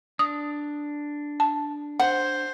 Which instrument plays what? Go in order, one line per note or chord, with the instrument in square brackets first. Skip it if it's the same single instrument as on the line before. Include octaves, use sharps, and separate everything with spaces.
[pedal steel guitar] D4 [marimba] D#6
[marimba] A5
[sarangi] C5 [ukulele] F#5